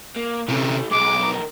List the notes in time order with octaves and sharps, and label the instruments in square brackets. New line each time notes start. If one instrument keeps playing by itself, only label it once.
[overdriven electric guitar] A#3
[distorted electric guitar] C3 C#4 [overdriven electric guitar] E3 A3
[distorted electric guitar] B1 [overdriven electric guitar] G#3 [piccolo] D6
[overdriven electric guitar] D3 A#4